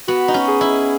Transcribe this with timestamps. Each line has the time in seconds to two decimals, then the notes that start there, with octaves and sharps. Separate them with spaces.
0.08 B3 F#4
0.28 D#4
0.34 C#4
0.48 G#4
0.61 E4